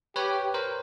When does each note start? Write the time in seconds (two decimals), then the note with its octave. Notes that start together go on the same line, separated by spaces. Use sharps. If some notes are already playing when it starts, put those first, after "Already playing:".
0.16 G4 B4 C#5
0.54 A#4 C5